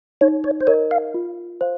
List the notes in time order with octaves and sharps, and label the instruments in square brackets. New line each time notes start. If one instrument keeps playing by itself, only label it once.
[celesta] D#4 [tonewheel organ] C#5
[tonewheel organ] C#5
C5
[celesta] A#4 D#5 [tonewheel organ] C#5
[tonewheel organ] F5
[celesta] F4
C5 F5